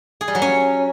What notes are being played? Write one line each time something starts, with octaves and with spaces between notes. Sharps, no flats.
G#4
G3
F#3
C#4